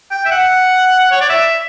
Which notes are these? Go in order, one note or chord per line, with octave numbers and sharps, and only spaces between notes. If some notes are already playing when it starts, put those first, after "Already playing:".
G5
E5
F#5
C#5
D5
E5